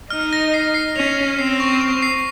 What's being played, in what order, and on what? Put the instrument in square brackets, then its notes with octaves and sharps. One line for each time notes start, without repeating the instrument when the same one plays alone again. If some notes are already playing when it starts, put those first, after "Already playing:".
[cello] D#4 [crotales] F6
[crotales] A#6
C7
C7
[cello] C#4 [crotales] F7
[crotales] F7
[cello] C4 [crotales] C7
[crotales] C#6
C#6
C7